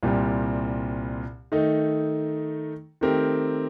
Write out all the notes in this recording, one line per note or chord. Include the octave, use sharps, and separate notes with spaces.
C2 A#2 G3 C4
D#3 A3 D#4
D#3 A3 C4 G4 A#4